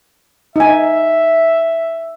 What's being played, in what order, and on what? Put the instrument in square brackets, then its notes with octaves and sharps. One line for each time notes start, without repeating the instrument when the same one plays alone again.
[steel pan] D#4 G#5 [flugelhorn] E5